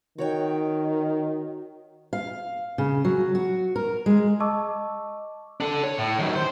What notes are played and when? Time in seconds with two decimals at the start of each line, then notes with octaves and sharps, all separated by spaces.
0.18 D#3 F#4 C#5 G5
2.13 F5
2.78 C#3
3.05 F#3
3.35 F#4
3.76 A#4
4.06 G#3
4.40 D#5 A5 C#6 D6 E6
5.60 D4 A4
5.84 C#5
5.98 A2
6.19 D#3 F#3
6.36 C5